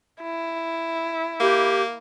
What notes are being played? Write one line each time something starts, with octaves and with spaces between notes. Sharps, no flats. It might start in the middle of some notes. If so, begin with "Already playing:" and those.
E4
A#3 G4